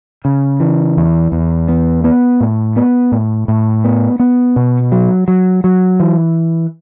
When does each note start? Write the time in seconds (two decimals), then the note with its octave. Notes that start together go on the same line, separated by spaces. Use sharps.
0.25 C#3
0.60 E3
0.97 E2
1.32 E2
1.68 B3
2.04 B3
2.40 A2
2.76 B3
3.12 A2
3.48 A2
3.84 B3
4.20 B3
4.56 B2
4.92 F#3
5.28 F#3
5.64 F#3
6.00 E3